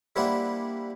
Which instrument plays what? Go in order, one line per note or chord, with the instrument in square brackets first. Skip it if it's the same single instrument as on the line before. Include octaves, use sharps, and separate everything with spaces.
[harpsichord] G3 A#3 D4 E4 C5 F#5